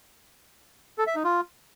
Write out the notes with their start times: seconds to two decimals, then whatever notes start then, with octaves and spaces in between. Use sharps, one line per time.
0.98 A4
1.07 E5
1.16 D#4
1.24 F4